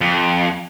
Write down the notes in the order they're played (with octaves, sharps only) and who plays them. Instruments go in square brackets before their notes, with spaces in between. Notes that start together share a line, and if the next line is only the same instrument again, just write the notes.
[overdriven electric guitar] F2